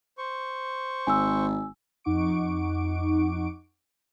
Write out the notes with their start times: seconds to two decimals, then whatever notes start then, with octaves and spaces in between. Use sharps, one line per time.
0.18 C5 C#6
1.07 G#1 G#5 E6
2.04 F2 D#4 F#5 C#6 D6 D7